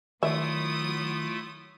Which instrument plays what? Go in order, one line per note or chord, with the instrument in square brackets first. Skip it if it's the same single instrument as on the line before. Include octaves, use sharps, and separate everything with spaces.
[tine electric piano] D#3 [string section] F#3 D#6 [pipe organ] A3 E4 F4 [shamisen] E5